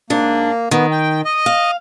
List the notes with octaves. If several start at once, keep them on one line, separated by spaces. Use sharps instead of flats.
G#2 A#3 D4
D#3 B3
G5
D#5
F5